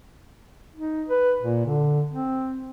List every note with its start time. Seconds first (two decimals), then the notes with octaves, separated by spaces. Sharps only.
0.75 D#4
1.08 B4
1.42 A#2
1.65 D3
2.12 C4